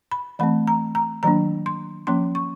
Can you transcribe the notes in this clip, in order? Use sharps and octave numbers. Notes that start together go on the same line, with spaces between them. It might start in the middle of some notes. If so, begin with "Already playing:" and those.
B5
E3 A3 C4 B5
A#5
A#5
D#3 F#3 A#3 D4 A#5
C6
F3 A#3 C#4 C6
C#6